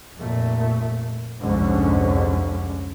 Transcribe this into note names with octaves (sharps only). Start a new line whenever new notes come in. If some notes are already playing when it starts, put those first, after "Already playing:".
F1 A#2 A3
C2 F2 G#2 D3 C#4